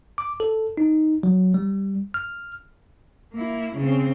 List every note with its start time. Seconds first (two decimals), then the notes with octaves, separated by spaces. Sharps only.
0.18 D6
0.40 A4
0.78 D#4
1.23 F#3
1.54 G3
2.14 F6
3.34 A#3 E4
3.77 C#3 C4